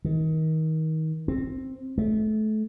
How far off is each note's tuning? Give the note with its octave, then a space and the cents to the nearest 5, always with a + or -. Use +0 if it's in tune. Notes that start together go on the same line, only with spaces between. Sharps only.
D#3 +25
C4 +10
A3 -30